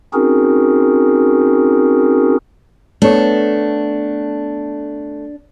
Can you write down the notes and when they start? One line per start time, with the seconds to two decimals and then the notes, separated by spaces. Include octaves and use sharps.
0.13 C4 C#4 D#4 F#4 G#4 A#4
3.02 A3 B3 D4 C#5